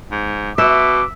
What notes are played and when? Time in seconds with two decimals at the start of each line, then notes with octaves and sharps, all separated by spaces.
0.11 G#2
0.58 B2 E5 D6